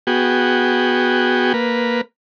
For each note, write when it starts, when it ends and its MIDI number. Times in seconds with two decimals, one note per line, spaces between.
0.07 1.53 59
0.07 1.53 66
0.07 1.53 68
0.07 1.53 79
1.54 2.01 58
1.54 2.01 71